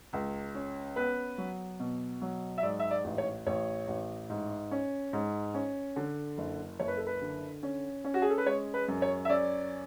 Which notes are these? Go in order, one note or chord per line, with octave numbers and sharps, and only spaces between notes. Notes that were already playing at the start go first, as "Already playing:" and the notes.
C#2
C#4
B3 B4
F#3
B2
F#3
E5
G#2 D5
E5
D5
A1
C#5
A1 C#5
A1
G#2
C#4
G#2
C#4
D3
F#1
F#1 C#5
B4
A4
B4
D3
C#4
C#4
F#4
G#4
A4
B4
G#3 C#5
B4
F#2
C#5
E5
C#4 D5